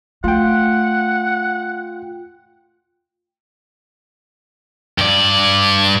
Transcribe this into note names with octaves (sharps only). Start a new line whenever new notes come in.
A3 F4 F#5 G5
G2 D5